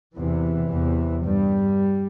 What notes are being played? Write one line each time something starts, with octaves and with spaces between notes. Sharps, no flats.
E2 C3 E3
E2 C3
G2 G3